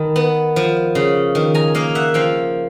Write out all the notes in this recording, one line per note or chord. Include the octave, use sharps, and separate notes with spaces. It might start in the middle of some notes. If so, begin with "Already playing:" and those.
Already playing: D#3 A5 B5
B3
F3
C#3
D#3
G#5 A#5
A#3 D#5 F5
E5 F#5
F3 F5 G5